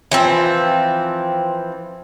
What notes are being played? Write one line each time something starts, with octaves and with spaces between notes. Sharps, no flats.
E3 F3 C4